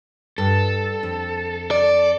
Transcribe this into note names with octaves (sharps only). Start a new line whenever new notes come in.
G2 A4
F2
D5